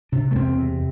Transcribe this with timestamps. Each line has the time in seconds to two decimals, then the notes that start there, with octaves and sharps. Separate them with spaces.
0.12 C3 D4
0.31 A3
0.35 E2 C4
0.59 C3